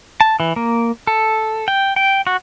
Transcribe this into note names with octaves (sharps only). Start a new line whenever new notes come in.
A5
E3
A#3
A4
G5
G5
F#4